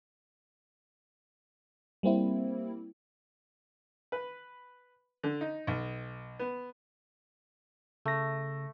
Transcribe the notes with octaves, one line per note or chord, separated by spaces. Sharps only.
G3 A#3 C4 E4
B4
D3
D#4
B1
B3
C#3 A3 A#6